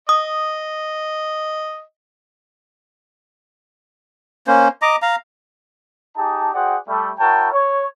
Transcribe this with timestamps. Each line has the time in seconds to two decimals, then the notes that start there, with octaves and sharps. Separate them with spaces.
0.09 D#5 D#6
4.47 A#3 C#4 C5
4.82 D#5 A#5 D6
5.02 F5 A#5
6.16 D#4 G4 G#4 A5
6.54 F#4 G#4 C5 D5 F#5 G5
6.88 G3 A3
7.19 E4 F#4 A#4 C#5 G5 A5
7.52 C#5